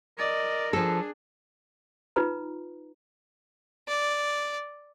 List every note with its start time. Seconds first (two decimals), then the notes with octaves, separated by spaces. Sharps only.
0.18 A#4 D5 D#5
0.73 F3 D4 G#4 A4
2.16 D#4 F4 B4 A#5
3.88 D5